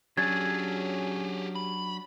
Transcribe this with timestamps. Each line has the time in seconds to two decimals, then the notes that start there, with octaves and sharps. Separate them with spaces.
0.17 F#3 C#4 D4 G4 G#4 G#6
1.55 B5